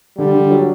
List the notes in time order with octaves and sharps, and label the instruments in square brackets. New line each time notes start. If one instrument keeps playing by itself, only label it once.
[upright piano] D3 [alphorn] G3
[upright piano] D3
F#3